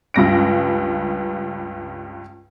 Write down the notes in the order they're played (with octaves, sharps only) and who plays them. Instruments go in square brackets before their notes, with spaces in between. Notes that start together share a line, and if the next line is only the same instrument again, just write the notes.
[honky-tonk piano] C#2 G2 A#6 D7